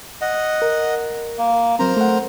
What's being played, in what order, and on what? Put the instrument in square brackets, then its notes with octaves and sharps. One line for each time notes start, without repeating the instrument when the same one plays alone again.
[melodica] D#5 F#5
[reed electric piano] A#4
[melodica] A#3
[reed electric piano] F#3 C4 [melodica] A#4 C5 A#5
[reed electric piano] A3 F#5